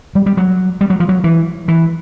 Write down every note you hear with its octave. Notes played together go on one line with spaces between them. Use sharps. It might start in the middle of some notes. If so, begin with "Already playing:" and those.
G3
G3
F#3
G3
F#3
F3
F#3
E3
E3